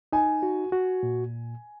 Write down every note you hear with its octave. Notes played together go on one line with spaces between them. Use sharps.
D#4 G#5
F#4
F#4
A#2